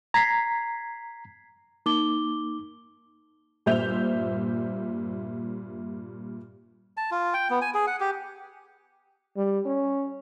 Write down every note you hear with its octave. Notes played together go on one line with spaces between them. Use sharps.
A#5 G#6 B6 C7
A#3 D#4 D6 G7
G2 A#2 C5 E5 G6 F7
A5
F4
G5
B3
G#5
G#4
F#5
G4
G3
C#4